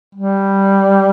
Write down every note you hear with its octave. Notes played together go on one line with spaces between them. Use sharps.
G3